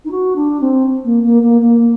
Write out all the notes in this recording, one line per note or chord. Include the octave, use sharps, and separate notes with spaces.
D#4
F#4
D4
C4
A#3
A#3
A#3
A#3